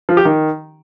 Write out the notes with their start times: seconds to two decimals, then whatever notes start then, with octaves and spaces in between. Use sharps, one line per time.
0.09 F3
0.17 G4
0.25 D#3